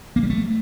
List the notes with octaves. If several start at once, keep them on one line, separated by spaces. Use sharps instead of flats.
A#3
G3
A3